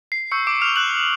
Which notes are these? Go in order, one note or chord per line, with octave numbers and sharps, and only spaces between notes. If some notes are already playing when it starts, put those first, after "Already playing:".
C7
C#6 E6 G6 C#7
D6 D7
F6 F7
F#6 F#7
D#6 F#6